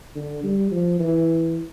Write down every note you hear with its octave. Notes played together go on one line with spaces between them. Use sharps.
D3
G3
F3
E3